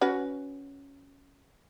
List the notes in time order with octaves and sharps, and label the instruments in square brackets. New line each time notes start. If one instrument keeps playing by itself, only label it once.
[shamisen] C#4 F#4 B4